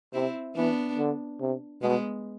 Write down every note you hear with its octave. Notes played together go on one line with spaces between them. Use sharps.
C3 C4 E4
E3 B3 D4
D3
C3
B2 G#3 B3